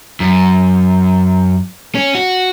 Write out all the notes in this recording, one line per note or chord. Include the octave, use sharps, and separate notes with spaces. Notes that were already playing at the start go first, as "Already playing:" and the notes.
F#2
C#4
F#4